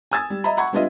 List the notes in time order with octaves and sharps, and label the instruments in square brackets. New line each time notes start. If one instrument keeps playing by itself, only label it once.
[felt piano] G#5 D#6 E6 G#6 A6
G3
D#5 E5 A#5 B5
F#5 B5 C#6 G#6
G3 B3 D4 F4 D#5 E5